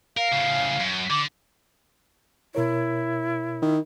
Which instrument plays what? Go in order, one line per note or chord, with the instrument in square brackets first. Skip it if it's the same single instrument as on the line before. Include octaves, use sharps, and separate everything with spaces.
[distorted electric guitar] A#4 [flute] F5
[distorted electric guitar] A2 C#3
F#2
[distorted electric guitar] D3 [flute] D6
[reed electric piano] B2 A#4 C#5 [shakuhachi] E4
[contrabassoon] D#3